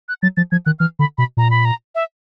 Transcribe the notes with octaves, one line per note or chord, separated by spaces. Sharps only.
F#6
F#3 A6
F3 A6
F3 G#6
D#3 F#6
E3 F6
D3 B5
B2 B5
A#2 A#5
B5
A#5
E5